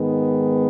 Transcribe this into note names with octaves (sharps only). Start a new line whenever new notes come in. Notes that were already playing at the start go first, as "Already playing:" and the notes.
Already playing: G#2 D#3 G#3 B3